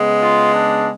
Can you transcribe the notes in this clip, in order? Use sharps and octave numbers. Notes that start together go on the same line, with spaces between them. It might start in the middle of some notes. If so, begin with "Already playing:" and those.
Already playing: C#3 G#3 B3
F4
D4